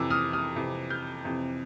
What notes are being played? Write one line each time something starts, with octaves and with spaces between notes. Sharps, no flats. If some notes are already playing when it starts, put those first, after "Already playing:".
Already playing: F2 C3 E3 D6 E6
D#6 F6
D#6 F6
F2 C3 E3
F6 G6
F2 C3 E3